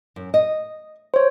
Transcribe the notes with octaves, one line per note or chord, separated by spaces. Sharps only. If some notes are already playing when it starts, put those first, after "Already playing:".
F#2
D#5
C5 C#5